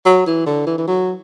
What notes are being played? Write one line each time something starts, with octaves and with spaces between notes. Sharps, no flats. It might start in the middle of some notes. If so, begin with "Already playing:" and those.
F#3
E3
D3
E3
E3
F#3